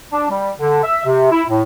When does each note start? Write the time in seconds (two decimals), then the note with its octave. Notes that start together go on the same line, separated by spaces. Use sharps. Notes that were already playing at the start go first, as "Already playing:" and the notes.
0.12 D4
0.30 G3
0.59 D3
0.84 E5
1.05 C3
1.31 E4
1.49 A2